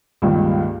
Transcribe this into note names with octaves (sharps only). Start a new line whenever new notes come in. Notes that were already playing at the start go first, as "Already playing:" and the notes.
C#2 G2 A#2 D#3